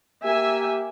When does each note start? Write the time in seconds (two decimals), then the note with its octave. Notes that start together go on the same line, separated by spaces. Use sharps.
0.24 A#3 G4 E5 G#5